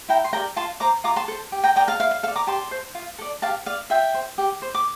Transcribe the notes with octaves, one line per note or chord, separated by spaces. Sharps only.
E4 G5 A#5
C6
G4 A#4 D5 G5 A#5
F4 A5 C6
C5 A#5 D6
F4 A#5 D6
A5 C6
A4 C5
G4
G5 A#5
A#4 D5 G5 A#5
F5 A5
E4 F5
F5
A4 D5 F5
A#5 D6
G4 A5 C6
C5
F4
A4 D5
G4 F5 A5
D5 F5
F4 E5 G5
C5
G4
C5
D6